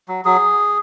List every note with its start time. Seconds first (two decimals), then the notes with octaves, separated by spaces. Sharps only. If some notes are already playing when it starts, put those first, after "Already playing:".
0.08 F#3
0.25 F#3 G#4